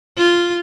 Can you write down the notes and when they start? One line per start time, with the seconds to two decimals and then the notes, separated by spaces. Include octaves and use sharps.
0.18 F4